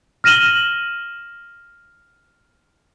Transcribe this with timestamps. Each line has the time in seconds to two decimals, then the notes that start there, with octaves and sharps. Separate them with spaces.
0.24 F6 A#6 D#7 E7 F#7 G7